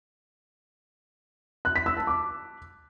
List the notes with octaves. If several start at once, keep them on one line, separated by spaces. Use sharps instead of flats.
F#6
B6
E6
A5
D6